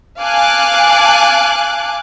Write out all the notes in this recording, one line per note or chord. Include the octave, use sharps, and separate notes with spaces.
F5 G#5 A5 D6 F#6